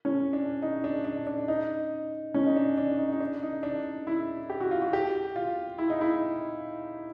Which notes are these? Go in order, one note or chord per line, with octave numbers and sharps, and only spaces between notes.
C#4
D4
D#4
D4
D4
D4
D#4
C#4
D#4
D4
D4
D#4
D#4
D4
D#4
D4
E4
G4
F#4
F4
F#4
G4
F4
E4
D#4
E4